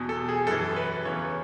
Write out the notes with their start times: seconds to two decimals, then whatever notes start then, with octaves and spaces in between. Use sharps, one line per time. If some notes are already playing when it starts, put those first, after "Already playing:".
Already playing: E2 B2
0.09 A4
0.29 G#4
0.47 F#2 E3 A4
0.76 B4
1.05 E2 C#3 E3 C#5